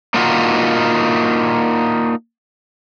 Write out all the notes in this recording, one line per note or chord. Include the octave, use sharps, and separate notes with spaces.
A#3 D4 D#4 F4 F#4